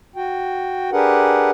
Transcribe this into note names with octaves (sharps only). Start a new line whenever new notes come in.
F#4 G5
D4 G4 G#4 A#4 B4 F#5